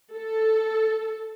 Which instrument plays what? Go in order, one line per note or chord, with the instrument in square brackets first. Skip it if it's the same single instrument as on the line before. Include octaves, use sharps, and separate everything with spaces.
[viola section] A4